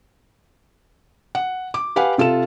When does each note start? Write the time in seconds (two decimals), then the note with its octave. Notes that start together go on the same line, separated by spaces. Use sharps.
1.35 F#5
1.74 D6
1.96 G4 B4 F5 F#5 G#5
2.18 C3 F4 A4 E7